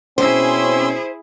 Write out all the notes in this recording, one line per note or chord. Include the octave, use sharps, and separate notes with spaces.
B2 C4 C#4 E4 G#4 C5 C6 E6